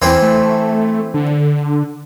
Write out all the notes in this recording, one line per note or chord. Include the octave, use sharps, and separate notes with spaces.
E2 E3 C4
A3
D3